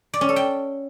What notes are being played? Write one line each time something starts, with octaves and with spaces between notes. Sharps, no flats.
D5
C#4
A4
G5